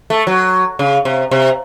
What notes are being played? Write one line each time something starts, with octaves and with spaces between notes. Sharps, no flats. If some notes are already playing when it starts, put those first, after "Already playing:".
A3
F#3
C#3
C3
C3